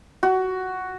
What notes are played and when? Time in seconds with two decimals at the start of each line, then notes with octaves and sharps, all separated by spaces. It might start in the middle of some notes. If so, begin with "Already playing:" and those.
0.23 F#4